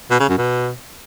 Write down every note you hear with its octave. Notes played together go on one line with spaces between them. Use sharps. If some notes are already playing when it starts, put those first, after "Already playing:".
B2
C#3
F#2
B2